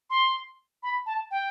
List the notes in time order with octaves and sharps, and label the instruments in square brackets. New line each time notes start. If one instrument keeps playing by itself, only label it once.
[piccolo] C6
B5
A5
G5